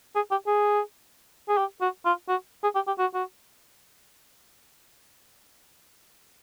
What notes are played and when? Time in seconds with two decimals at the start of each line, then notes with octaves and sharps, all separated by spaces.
0.15 G#4
0.31 G4
0.47 G#4
1.49 G#4
1.57 G4
1.81 F#4
2.05 F4
2.28 F#4
2.63 G#4
2.75 G4
2.87 G4
2.98 F#4
3.14 F#4